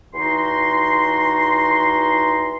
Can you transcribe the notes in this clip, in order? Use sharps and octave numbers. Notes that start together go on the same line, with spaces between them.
E2 D#4 F#4 C6